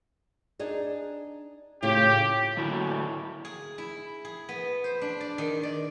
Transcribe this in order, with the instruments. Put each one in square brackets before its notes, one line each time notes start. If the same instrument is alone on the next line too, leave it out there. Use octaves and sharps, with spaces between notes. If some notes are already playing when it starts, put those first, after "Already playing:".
[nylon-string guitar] D4 D#4 G#4
[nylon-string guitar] A2 C#3 F4 [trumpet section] G4
[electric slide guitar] A2 D3 A3 A#3 E4 F#4
[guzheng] G#4
E4
G#4
B3
C5
D4
D5
D#3
D5